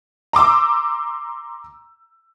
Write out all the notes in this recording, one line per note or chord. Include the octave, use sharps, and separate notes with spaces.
A#5 C6 D6 E6